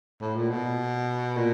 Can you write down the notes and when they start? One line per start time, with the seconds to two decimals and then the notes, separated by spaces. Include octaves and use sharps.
0.21 A2
0.35 A#2
0.50 B2
1.37 A#2